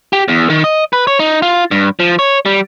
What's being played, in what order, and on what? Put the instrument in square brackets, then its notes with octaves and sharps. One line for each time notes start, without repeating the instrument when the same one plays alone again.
[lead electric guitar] G4
E2
D#3
D#5
B4
C#5
D#4
F4
G2
F3
C#5
G3